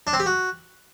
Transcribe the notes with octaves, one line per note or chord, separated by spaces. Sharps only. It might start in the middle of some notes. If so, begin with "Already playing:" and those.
D4
C4
G4
F#4